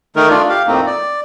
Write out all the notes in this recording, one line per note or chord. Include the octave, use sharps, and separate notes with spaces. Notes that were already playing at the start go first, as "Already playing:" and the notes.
D#3 A3 D#4 A#4
A3 D4 F4 D5
G4 F5
F2 A2 A3 A#3 C4 D#4
D5